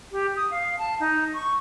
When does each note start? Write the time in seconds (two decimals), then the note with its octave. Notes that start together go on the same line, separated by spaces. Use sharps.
0.12 G4
0.36 D#6
0.51 F5
0.79 A5
1.00 D#4
1.34 C#6